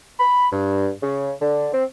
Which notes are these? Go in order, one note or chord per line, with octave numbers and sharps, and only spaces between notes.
B5
G2
C#3
D3
C4